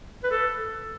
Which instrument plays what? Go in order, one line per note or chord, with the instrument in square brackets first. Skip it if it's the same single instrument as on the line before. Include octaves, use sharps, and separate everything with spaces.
[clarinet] B4
A4